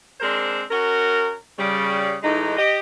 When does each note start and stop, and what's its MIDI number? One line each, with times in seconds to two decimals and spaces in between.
0.21 0.62 56
0.21 0.62 60
0.21 0.62 62
0.21 0.62 70
0.21 0.62 72
0.71 1.34 61
0.71 1.34 66
0.71 1.34 70
1.58 2.15 49
1.58 2.15 55
2.23 2.55 45
2.23 2.55 52
2.23 2.55 56
2.23 2.55 63
2.57 2.78 67
2.57 2.78 75